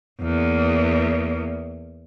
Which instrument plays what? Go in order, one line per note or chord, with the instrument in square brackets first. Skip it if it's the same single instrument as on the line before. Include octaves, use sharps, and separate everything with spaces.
[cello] E2 A#3